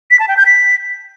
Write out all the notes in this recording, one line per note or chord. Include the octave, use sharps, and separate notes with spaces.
B6
A5
G5
G6
B6